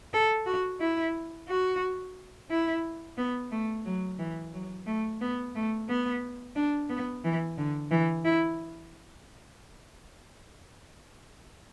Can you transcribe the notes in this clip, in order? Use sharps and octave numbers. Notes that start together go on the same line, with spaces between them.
A4
F#4
E4
F#4
E4
B3
A3
F#3
E3
F#3
A3
B3
A3
B3
D4
B3
E3
D3
E3
E4